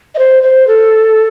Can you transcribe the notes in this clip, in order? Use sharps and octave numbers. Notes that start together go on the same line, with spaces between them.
D#5
C5
C5
A4